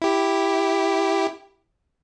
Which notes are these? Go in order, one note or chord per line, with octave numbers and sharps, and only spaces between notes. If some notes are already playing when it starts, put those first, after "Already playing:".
E4 G4